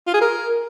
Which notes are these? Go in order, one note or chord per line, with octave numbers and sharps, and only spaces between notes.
F4
G#4
A#4